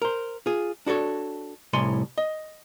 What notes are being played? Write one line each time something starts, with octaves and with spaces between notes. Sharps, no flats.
A#4 C5
F4 G#4
D4 F#4 G#4 A4 C#5
C2 A2 C#5 G#5 C6
D#5